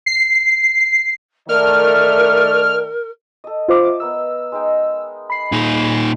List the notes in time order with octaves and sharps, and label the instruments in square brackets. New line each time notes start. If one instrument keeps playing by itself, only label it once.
[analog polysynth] C7
[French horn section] D#3 A3 D5 [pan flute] A#4 [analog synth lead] F6
[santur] A4 D#5
[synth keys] F4 C5 D6 [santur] D#5 E5
[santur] B3 A#4 D#5 [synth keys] E6
[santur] G#3 D#4 G5
[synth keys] B5 C7
[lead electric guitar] A#2 D#4 [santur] G#4